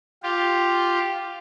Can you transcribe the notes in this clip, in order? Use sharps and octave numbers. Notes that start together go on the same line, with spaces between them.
F4 G4